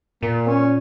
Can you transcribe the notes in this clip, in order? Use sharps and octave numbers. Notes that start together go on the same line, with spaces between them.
A#2 A#3
C#4